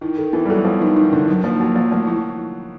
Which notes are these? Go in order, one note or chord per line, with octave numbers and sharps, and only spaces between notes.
D#3 E4
D#3 A4
E3 B3
G3
F#3 A4
F3 B3
E3 D#4
D#3 D#4
D3 D#4
D#3 F#3
F3 A#3
F#3 A#3
F3 A#3
F3 A3
E4